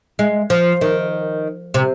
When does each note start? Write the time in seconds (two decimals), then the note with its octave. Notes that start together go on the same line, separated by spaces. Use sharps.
0.19 G#3
0.50 F3
0.81 D#3
1.74 C3